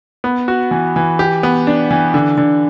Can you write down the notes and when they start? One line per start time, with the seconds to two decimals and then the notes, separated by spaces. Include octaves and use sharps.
0.24 B3
0.48 F#4
0.71 E3
0.96 E3
1.19 G4
1.43 B3
1.67 D4
1.91 E3
2.14 D3
2.38 D3